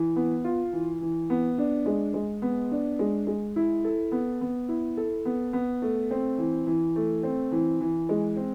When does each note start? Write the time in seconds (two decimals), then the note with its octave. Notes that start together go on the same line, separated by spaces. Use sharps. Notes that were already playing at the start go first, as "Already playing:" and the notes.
Already playing: E3
0.16 B3
0.44 F4
0.73 E3
1.01 E3
1.30 B3
1.58 D4
1.86 G#3
2.14 G#3
2.42 B3
2.71 D4
2.99 G#3
3.27 G#3
3.56 E4
3.84 A4
4.12 B3
4.41 B3
4.69 E4
4.97 A4
5.25 B3
5.53 B3
5.82 A3
6.11 C4
6.38 E3
6.67 E3
6.96 A3
7.23 C4
7.52 E3
7.81 E3
8.09 G#3
8.37 C4